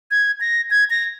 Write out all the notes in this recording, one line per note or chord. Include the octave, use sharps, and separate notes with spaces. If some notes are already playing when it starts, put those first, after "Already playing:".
G#6
A#6
G#6
A#6